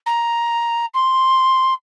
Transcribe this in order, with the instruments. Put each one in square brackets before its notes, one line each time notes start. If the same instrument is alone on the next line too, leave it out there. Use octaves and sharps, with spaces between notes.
[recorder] A#5
C6